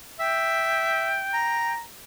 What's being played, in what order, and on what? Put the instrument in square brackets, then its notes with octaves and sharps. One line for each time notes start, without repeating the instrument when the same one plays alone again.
[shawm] E5 [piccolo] G5
[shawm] A#5